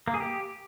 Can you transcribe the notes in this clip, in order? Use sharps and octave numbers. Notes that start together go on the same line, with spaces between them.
A#3
G#4
G4